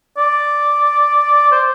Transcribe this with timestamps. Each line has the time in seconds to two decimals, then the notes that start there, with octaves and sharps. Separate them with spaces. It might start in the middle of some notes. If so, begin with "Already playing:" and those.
0.18 D5
1.52 C5